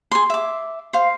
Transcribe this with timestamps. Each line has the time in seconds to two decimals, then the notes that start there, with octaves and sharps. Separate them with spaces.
0.11 G#4 C6
0.30 E5 D6
0.93 C5 F5